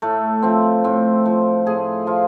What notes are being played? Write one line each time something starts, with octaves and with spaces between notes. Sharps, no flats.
A2 A3
F3 C4
A2 C4
F3
A2 G#4
F3 F4